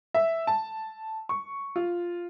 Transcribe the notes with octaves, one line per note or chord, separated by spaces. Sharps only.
E5
A5
C#6
F4